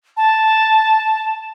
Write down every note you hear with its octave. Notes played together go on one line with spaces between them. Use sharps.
A5